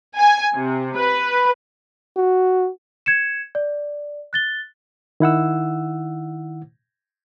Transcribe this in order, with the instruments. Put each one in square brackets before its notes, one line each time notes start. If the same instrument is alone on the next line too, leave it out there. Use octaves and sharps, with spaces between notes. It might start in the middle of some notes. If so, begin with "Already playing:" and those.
[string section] G#5
C3
B4
[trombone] F#4
[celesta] G#6 C#7 E7
D5
F#6 A6 G7
[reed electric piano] D#3 E4 F#5 E6